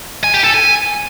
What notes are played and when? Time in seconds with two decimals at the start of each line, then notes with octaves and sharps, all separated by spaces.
0.24 G#5
0.34 G4
0.44 A4
0.54 G#5